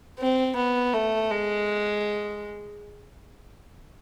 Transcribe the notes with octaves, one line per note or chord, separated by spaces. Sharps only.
C4
B3
A3
G#3